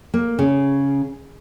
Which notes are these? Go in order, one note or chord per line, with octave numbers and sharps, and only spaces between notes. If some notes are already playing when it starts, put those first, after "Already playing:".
A#3
C#3